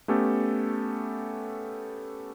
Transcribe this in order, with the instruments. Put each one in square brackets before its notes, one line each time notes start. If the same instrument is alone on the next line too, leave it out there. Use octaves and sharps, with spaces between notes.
[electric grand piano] A3 B3 C#4 G4 A4